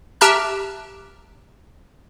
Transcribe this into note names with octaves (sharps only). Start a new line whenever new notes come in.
G4 E5 A5 A#5 F6 F#6